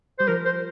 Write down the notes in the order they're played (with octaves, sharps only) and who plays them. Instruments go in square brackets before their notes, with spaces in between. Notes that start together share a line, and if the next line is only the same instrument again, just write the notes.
[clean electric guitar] G3 [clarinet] C5
[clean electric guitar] F3 [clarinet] A#4
[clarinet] C5